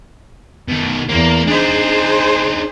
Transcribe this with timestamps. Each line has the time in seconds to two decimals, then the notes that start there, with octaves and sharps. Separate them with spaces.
0.68 B2 D#3
1.09 E2 A#3
1.47 D4 D#4 G#4 C5